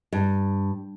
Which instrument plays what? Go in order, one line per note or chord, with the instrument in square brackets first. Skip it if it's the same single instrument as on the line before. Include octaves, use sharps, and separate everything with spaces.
[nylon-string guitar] G2